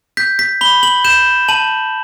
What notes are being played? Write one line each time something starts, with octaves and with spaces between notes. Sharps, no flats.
G6 B6
B6
B5 G7
F#7
G6 E7
A5 F#7